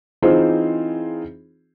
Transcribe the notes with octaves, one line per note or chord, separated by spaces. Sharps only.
E3 C4 D#4 F4 G#4 C5